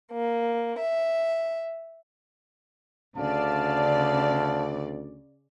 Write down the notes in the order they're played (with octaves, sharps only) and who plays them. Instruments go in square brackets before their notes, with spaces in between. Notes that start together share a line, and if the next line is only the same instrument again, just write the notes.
[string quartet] A#3
E5
[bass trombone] D2 [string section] C#3 D5 [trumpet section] F5 A5